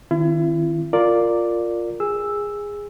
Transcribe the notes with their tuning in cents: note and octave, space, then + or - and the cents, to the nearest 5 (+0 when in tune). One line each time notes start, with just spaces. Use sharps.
D#3 +0 C4 +0 E4 +40
F4 +5 A#4 -10 D5 +0
G#4 -15 E6 +0